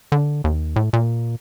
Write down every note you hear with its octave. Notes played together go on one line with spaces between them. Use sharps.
D3
D#2
A2
A#2